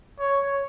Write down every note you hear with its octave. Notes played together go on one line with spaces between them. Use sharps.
C#5